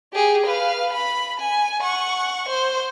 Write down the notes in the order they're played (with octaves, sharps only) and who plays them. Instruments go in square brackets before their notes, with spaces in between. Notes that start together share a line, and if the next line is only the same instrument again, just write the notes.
[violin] G4 G#4
B4 F5
B5
G#5
F#5 C#6
C5